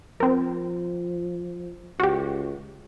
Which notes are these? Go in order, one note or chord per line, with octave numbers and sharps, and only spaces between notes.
F3 C4 A#4
C#2 F#4 G4